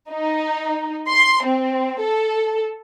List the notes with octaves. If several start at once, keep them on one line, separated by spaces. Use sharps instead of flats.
D#4
C6
C4
A4